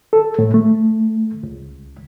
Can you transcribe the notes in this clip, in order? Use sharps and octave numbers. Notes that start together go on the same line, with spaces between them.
A4
A2
A3
C#2